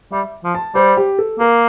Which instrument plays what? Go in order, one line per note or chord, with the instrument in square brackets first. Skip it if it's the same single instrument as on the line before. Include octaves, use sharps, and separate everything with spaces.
[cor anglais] G3 [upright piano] E5
[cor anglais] F3
[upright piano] A5
[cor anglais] G3 [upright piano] C5
[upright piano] G4
A4
[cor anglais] A#3 [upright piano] A#4